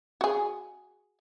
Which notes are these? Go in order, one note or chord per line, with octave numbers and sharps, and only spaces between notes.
F#4 G#4